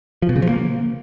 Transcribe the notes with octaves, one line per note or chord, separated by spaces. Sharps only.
F3
B2
C#3
F3
A#3